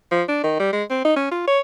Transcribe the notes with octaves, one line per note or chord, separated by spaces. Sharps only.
F3
D4
D#3
G3
G#3
C4
D#4
C#4
F4
C#5